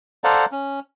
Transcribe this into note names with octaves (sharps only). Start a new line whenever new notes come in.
A4 C5 D5 F5 F#5 A#5
C#4